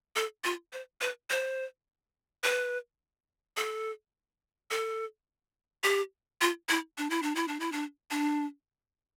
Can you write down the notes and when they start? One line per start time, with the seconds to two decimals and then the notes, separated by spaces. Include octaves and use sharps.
0.16 A4
0.44 F4
0.73 C5
1.01 B4
1.30 C5
2.43 B4
3.57 A4
4.71 A4
5.84 G4
6.41 F4
6.69 E4
6.98 D4
7.10 E4
7.22 D4
7.35 E4
7.48 D4
7.60 E4
7.72 D4
8.11 D4